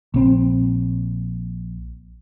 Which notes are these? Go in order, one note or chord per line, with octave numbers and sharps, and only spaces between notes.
A#1 C4